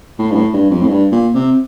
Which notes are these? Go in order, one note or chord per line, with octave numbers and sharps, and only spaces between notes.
A2
G2
A2
G2
F2
A2
G2
A#2
C3